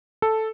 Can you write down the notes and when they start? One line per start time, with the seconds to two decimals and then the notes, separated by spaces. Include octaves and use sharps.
0.22 A4